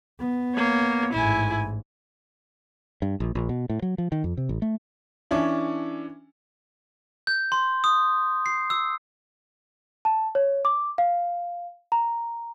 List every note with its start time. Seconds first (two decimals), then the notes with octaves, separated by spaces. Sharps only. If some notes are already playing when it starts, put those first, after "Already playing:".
0.20 B3
0.56 A#3 C#5
1.13 A1 G#2 E4 G#5
3.02 G2
3.20 A#1
3.35 A#1
3.49 B2
3.70 A2
3.82 F#3
3.98 F3
4.12 D#3
4.24 F2
4.37 C3
4.49 A1
4.62 A3
5.31 E3 C#4 D4 E4
7.27 G6
7.52 C6
7.84 D#6
8.46 C7
8.70 E6
10.05 A5
10.35 C#5
10.65 D6
10.98 F5
11.92 A#5